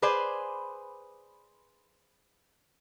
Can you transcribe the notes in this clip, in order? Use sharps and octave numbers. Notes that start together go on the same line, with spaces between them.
G#4 B4 C5 D5 G#5